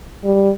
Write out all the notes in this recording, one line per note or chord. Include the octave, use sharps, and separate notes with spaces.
G3